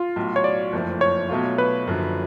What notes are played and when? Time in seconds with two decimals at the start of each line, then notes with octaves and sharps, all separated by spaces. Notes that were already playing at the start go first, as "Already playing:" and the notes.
Already playing: F4
0.16 B1 A2 F#3
0.36 C#5
0.44 D5
0.72 F#1 F2 F3 A3
1.01 C#5
1.29 B1 B2 F#3 A3 F4
1.58 B4
1.86 F#1 F#2 D3 F3